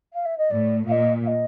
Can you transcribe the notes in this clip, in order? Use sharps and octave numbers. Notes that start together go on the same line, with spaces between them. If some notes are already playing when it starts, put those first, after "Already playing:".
F5
E5
D#5
A2 D5
A#2 D#5 F5
F5
D#5